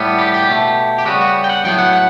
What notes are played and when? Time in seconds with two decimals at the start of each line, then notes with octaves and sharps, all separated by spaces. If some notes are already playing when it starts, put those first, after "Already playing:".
Already playing: A2 G3 B3
0.19 G4
0.34 G4
0.48 B2 A3
0.98 G4
1.06 C#3 G3 B3 F#4
1.21 F#4
1.44 G5
1.49 F#5
1.64 A2 F#3 B3 G5
1.78 F#5
1.93 F#5